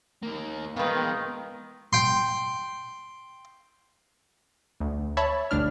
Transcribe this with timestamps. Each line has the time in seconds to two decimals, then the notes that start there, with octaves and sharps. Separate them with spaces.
0.22 D#3 A#3
0.76 D#3 G#3 B3 F4 A#4 B4
1.93 G5 C6
4.80 D2
5.17 C#5 E5 A5 B5
5.51 G1 D2 D4 F6